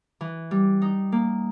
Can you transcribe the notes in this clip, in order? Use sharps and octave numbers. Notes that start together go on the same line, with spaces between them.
E3
G3
D#4
A#3